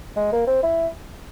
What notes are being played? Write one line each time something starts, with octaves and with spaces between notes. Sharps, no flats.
G#3
A#3
C4
E4